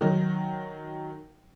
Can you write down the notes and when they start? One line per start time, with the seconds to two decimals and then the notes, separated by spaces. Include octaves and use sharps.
0.01 D#3 F#3 D#4